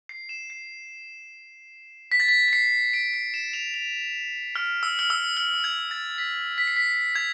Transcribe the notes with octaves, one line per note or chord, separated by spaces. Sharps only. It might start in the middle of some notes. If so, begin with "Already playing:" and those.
C7
E7
C7
B6
A6
B6
B6
C7
D7
C7
E7
F7
F7
F6
E6
F6
E6
F6
G#6
A6
B6
B6
C7
B6
G#6